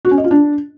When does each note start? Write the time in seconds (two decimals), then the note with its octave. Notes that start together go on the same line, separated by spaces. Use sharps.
0.05 F#4
0.11 C#4
0.18 D#5
0.24 F4
0.31 D4